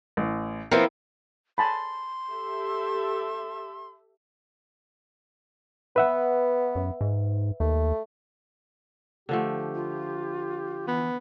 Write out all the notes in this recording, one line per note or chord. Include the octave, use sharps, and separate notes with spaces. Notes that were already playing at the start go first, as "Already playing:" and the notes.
A1
F3 B3 C4 E4 A#4
G#5 A5 B5 C6
G4 A4 E5
B3 B4 E5 F#5
F#2
G#2
D#2 A3
D3 F3 A3 G4
F4
E3 B3